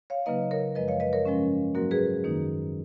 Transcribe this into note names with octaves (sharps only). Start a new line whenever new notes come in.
C#5 F5
C#3 F#3 A#3 D#4 B4 D#5
A#4 C#5
F#2 F3 G#3 B4 D#5
C#5 F5
B4 D#5
A#4 C#5
G#2 F3 G#3 C#4
G#2 F#3 A#3 F#4 A#4
G#4 B4
F#2 D#3 A#3 D#4